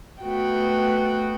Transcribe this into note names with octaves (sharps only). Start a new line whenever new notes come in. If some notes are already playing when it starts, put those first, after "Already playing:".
A3 B3 F#4 G5